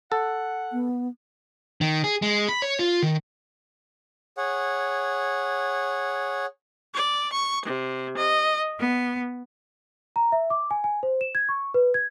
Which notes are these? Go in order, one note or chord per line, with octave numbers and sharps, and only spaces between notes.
A4 F#5
B3
D#3
G#4
G#3
B5
C#5
F4
D#3
G#4 C#5 F#5
D5
C#6
C3
D#5
B3
A#5
E5
D6
G#5
G#5
C5
E7
G#6
C#6
B4
G#6